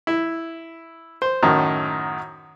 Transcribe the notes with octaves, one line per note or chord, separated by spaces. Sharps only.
E4
C5
F#2 A2 D#3